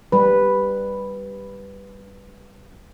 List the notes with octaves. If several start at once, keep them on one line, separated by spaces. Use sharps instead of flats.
G3 B4